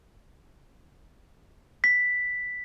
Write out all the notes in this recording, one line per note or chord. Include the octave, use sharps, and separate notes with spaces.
B6